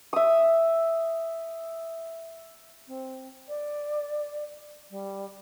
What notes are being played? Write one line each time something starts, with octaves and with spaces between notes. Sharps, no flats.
E5 D#6
C4
D5
G3